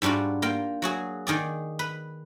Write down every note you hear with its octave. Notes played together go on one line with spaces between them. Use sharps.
G#2 G3 D4 F4 F#4
A#3 F4 G5
F#3 F#4 G#4
D#3 G#4 D5
B4